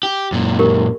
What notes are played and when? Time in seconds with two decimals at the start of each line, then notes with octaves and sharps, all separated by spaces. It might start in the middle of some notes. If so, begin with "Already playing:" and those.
0.03 G4
0.32 F#2 A#2
0.59 G4 A#4